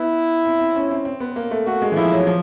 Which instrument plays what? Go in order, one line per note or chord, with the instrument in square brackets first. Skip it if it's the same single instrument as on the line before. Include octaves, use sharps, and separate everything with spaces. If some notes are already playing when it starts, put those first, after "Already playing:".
Already playing: [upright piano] B3 [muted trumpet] E4
[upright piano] C4
C4
C#4
C4
C4
B3
A#3
A3
[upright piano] A3 [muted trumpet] F#4
[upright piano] G#3
E3
[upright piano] F3 [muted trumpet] E4
[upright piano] F#3
F3